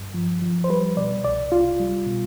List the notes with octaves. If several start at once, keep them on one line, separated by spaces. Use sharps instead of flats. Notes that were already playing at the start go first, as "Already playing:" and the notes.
Already playing: G2
F3
F3
C5
G3 B4
B2 D5
C2 D5
C2 F4
G3
B2